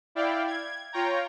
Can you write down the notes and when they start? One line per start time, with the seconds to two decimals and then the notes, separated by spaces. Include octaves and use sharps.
0.15 E4 D5 F5 G5
0.47 G#6
0.93 F4 C#5 G5 A#5